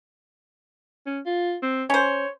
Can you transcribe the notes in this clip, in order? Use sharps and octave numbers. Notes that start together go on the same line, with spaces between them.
C#4
F4
C4
C#4 C5 C#5